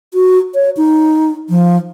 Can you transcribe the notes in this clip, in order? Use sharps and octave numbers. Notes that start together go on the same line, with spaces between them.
F#4
C#5
D#4
F3